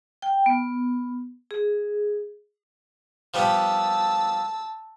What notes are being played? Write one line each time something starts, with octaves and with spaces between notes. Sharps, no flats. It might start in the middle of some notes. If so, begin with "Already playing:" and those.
G5
B3
G#4
F3 G3 B3 A5 E6